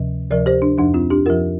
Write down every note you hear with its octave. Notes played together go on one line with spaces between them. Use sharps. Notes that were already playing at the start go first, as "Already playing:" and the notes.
Already playing: D2 C3 F3
D2 C3 F3 A#4 D5
G4 C5
D4
F2 F3 D4
C4 F4
D4 G4
F2 F3 F4 A#4